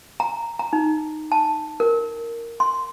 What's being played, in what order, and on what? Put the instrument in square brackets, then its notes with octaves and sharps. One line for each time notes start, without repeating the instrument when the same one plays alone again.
[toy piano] A#5
A#5
D#4
A5
A#4
C6